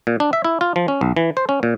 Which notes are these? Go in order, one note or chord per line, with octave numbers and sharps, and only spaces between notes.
A#2
D4
E5
E4
F4
F3
C#4
B1
E3
C5
C#4
A#2